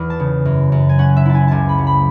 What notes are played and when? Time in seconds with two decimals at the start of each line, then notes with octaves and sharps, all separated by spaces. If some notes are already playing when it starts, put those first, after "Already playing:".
Already playing: E2
0.10 A5
0.20 C#3
0.45 F#2
0.72 F#2
0.89 G#5
0.99 C#4 F#5
1.16 E5
1.26 E4 A5
1.35 G#5
1.48 C#2 G#5 A5
1.69 B5
1.78 F#3
1.87 B5